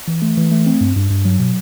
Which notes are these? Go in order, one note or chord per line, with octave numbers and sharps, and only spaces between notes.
E3
A3
E3
A3
C4
G2
G2
G2
F#3
B2